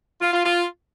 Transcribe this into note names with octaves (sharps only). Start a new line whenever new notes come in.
F4
F4
F4